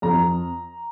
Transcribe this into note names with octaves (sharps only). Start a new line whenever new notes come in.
F2 A#5